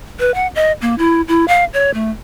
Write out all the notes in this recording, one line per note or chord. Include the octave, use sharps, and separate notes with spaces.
B4
F#5
D#5
A#3
E4
E4
F5
C#5
A3